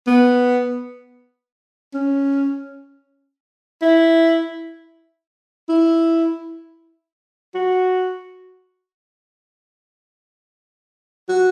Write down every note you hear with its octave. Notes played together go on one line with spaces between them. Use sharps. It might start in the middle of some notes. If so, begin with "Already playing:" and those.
B3
C#4
E4
E4
F#4
F#4